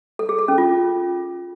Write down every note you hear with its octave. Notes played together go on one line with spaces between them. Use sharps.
A4
G#4
A4
C#4
F4